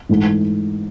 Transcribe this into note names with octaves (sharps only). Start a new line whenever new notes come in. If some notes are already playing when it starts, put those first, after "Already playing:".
G#2 E3 A3